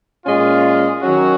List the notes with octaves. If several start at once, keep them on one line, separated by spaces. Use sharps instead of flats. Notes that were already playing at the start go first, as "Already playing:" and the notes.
A#2 G#3 C#4 F4
D#3 F#3 C#4 F#4